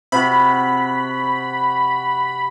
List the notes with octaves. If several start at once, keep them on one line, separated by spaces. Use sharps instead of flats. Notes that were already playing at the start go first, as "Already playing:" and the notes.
C3 F#4 B5